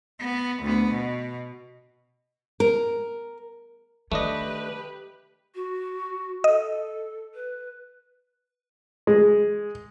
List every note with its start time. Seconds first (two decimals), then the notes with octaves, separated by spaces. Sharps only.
0.20 B3
0.62 D2 B3
0.92 B2
2.60 A#4
4.12 D#3 A3 D4 G4 B4 D#5
5.55 F#4
6.44 A4 D#5
7.34 B4
9.07 G#3